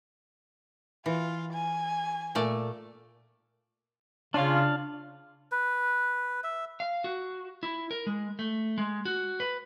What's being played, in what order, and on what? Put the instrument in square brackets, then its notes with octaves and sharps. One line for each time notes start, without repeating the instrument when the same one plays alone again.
[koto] E3 [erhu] F4
[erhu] G#5
[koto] A#2 A3 D5
[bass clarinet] C#3 [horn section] C#4 F4 [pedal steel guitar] D4 F5
[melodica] B4
E5
[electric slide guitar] F5
F#4
E4
A#4
G#3
A3
G#3
F#4
B4